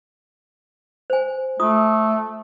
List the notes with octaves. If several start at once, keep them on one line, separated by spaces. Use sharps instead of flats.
C5 G#5
A3 F4 D#6